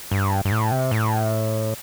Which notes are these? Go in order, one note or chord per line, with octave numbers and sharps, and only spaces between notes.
G2
G2
A2
C3
A2